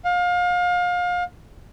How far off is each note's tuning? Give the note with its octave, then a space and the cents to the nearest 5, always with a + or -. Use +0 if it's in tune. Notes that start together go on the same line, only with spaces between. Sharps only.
F5 +30